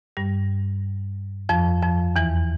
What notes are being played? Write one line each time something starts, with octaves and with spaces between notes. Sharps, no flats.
G2 G3
F2 F3
F2 F3
E2 E3